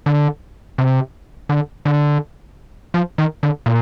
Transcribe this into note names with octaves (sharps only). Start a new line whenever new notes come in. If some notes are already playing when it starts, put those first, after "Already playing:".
D3
C3
D3
D3
F3
D#3
D3
A#2